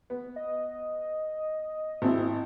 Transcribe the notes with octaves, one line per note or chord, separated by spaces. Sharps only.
B3
D#5
G#1 C4 E4